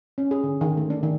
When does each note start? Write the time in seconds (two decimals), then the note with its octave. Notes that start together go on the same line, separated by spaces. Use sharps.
0.18 C#4
0.31 G#4
0.43 D3
0.61 D#3
0.77 A3
0.90 D4
1.03 D#3